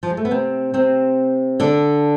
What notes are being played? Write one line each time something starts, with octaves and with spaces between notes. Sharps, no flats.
F3
G#3
A3
B3
C3 C4
C3 C4
D3 D4